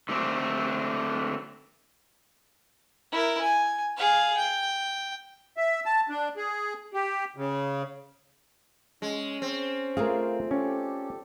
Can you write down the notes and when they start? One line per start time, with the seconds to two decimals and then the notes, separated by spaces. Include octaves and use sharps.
0.09 D3 A3 C4 D4
3.12 E4 A#4
3.41 G#5
3.97 G#4 F5
4.38 G5
5.57 E5
5.86 A5
6.09 D4
6.37 G#4
6.94 G4
7.37 C#3
9.02 G#3 C#4
9.42 C4
9.97 A3 F4 G#4 A#4 F5
10.51 C#4 G4 A4 D5